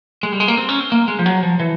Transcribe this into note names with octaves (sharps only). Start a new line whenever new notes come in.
G#3
G3
G#3
A#3
C4
C#4
C4
A#3
G#3
F3
F#3
F3
E3